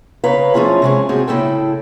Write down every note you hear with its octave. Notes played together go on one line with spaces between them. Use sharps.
C#3 B4 C#5 F5 A#5
F3 A3 C#4 E4 F4 G#4
C3 G#3 C#4
A2 C4 F#4 G#4
A2 C#3 A3 E4 A4 G5